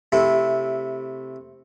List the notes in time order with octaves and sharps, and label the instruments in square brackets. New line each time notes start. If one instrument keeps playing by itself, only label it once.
[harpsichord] C3 A3 C4 E4